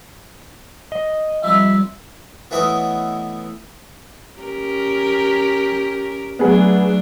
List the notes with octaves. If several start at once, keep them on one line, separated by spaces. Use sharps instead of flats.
D#5
F3 G3 C4 E5
E3 A3 B3 E4 C#5 D#5
C#4 G4 A#4
F#3 A3 B3 D4 G#4